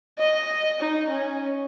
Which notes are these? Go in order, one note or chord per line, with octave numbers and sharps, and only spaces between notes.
D#5
D#4
C#4